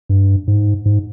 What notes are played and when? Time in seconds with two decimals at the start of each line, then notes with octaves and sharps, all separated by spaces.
0.09 G2
0.48 G#2
0.86 G#2